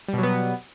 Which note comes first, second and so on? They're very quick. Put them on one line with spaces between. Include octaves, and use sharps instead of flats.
G3 B2 F#3 B3